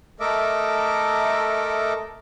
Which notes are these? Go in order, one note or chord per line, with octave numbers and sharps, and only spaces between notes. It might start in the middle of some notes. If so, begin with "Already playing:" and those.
A3 A4 A#4 D#5 E5 D6